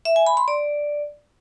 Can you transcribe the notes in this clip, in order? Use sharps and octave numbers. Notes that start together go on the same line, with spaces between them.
E5
G#5
B5
C6
D5